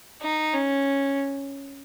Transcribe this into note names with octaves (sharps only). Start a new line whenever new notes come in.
D#4
C#4